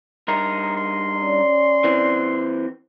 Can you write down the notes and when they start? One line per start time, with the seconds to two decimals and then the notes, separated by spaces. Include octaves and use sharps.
0.28 G2 D#4 A#4 C6
0.77 C6
1.15 C#4 D5
1.84 E3 C4